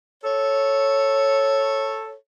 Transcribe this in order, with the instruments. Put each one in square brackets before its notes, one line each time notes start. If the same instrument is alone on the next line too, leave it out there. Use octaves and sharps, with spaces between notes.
[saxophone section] A4 C#5